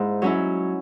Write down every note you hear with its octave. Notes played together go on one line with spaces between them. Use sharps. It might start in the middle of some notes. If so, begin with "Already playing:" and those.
Already playing: G#2 E4
F#3 C#4 E4